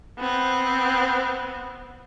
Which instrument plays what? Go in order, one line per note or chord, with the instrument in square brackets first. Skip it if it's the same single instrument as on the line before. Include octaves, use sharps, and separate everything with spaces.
[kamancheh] B3 C4